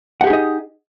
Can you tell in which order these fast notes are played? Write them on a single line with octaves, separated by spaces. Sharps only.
F#5 G4 G#4 D#4 D#5